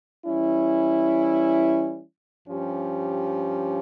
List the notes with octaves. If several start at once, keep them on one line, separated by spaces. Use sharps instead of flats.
E3 G3 C#4 E4
G2 F3 C#4 G4